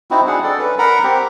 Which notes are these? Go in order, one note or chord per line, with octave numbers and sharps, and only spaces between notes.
C4 D#4 E4 F#4
D4 G#4 F#5
A4 D5
C#4 B4
A#4 F#5 A#5 B5
C4 G4